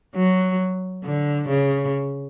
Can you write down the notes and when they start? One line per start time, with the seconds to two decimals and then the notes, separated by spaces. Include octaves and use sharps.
0.16 F#3
1.04 D3
1.49 C#3